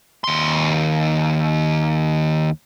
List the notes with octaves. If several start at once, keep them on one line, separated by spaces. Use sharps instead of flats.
D#2 C6